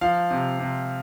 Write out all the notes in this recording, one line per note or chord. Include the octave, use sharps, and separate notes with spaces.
F3 F5
C3
C3